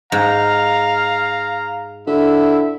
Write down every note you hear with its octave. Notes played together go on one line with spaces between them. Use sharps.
G#2 F5 A#5
D3 E4 E5